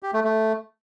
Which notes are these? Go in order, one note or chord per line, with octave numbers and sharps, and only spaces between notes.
G4
A3
A3